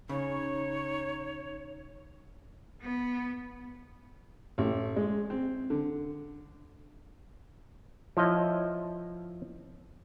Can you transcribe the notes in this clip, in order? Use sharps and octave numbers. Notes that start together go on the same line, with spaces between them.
C#3 D#4 C#5
B3
A1
G#3
C4
D3
F3 E4 C#5 D#5